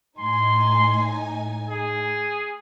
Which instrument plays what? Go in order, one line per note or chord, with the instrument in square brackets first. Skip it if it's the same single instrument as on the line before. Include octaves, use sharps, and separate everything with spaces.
[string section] A2 D#4 G#5 [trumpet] C6
[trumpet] G#4